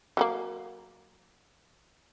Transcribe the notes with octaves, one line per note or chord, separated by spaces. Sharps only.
F#3 G3 A#3